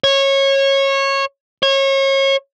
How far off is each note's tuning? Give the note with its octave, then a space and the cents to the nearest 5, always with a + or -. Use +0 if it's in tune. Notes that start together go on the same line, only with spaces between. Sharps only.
C#5 -20
C#5 -30